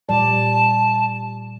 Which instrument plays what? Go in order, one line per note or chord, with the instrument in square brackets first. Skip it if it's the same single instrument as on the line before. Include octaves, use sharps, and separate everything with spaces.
[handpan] A#2 G3 D5 [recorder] A5